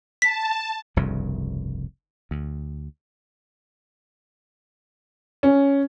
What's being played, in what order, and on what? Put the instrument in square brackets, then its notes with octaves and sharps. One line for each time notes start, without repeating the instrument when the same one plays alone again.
[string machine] A5 [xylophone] B6
[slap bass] F1 C2 G2 C#3
D2
[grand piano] C#4